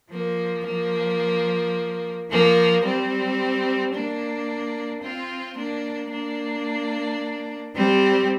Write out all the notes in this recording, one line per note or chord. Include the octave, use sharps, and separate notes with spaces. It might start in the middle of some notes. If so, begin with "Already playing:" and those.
F3 A#3
F3 A#3
F3 A#3
G3 C4
A#3 D4
C4 F4
A#3 D4
A#3 D4
G3 C4